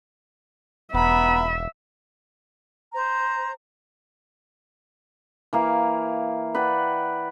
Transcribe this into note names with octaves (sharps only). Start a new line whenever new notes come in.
E1 B3 E5 A#5 B5
C5 A#5
E3 A#3 F5
B4 D5 F#5 G5